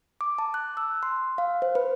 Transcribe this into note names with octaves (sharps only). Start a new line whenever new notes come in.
D6
A5
F#6
E6
C6
F5
C5
B4